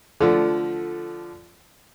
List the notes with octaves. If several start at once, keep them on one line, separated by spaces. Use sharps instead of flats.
D3 F3 A3